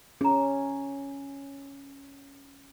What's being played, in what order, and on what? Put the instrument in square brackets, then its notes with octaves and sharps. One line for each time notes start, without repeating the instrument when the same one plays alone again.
[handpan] C#4 [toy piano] G#4 A#5